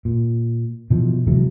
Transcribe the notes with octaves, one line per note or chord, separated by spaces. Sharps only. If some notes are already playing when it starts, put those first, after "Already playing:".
A#2
B2 E3 F3
C3 E3 F#3 G#3